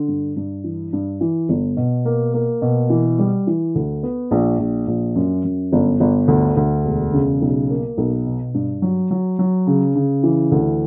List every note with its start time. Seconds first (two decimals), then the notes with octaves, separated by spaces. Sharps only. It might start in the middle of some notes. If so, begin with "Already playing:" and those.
Already playing: D3
0.08 G2
0.37 G2
0.64 E3
0.93 G2
1.21 E3
1.49 G1
1.77 B2
2.05 A#3
2.34 A#3
2.62 B2
2.90 E3
3.19 G3
3.47 E3
3.75 D2
4.03 B3
4.31 A#1
4.59 A#1
4.87 A#1
5.15 F#2
5.44 F#2
5.73 G1
6.00 G1
6.28 D2
6.57 D2
6.84 E1
7.13 C#3
7.42 B1
7.70 A#3
7.98 B1
8.26 B2
8.54 G2
8.82 F#3
9.11 F#3
9.39 F#3
9.67 C#3
9.95 C#3
10.23 E3
10.52 D2